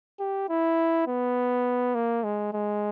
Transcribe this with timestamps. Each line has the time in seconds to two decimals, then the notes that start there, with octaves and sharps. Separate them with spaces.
0.20 G4
0.49 E4
1.07 B3
1.95 A#3
2.24 G#3
2.53 G#3